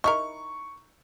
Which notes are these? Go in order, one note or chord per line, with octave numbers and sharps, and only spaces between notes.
D#4 E4 A#4 C#6